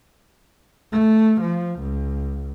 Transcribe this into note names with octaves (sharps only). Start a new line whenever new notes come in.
A3
F3
C#2